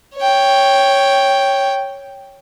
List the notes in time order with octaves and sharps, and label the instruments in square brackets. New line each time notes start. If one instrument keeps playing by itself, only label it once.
[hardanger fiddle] C#5 G5